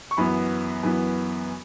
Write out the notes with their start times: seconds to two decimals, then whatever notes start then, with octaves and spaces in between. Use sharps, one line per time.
0.11 C#6
0.17 F#2 E3 B3 B5
0.83 F#2 E3 B3